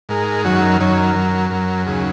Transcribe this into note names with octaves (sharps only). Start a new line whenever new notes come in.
G#2 G#3 A#4
F#2 D#3 F#3 F#4
A#4
F#2 D#3 F#3 C#5
A#4
F#2 F#3
F#2 F#3 A#4
D#2 C#3 F#3 G#4